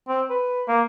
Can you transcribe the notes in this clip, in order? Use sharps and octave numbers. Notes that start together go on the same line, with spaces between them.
C4
B4
A#3